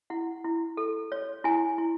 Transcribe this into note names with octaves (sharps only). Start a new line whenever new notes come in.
E4 F#5
E4
A4
C#5
E4 G#5
E4